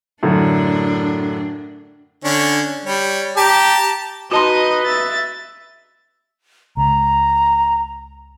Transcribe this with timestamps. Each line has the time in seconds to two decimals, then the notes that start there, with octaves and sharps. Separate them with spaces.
0.23 F#2 A2 D3 D4
2.24 D3 C#4 D4
2.85 G3 C#5
3.37 G4 A5 A#5
4.32 D#4 F#4 B4 D#5 A5 C6
4.86 E5 A6
6.77 C#2 A#5